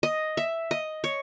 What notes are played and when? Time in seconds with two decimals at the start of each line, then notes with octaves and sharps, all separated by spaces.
0.03 D#5
0.37 E5
0.71 D#5
1.04 C#5